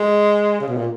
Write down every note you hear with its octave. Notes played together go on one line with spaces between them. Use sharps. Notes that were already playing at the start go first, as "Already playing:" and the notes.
Already playing: G#3
C#3
B2
A#2